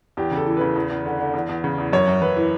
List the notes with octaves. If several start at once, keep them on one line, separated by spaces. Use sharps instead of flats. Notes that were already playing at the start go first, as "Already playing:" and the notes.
E2 G4
C#3
A4
E3
C#3 B4
E2
E2
D3
D3
E2
E2
C#3
E2
F#2 C#5
F#2
F#2 B4
E3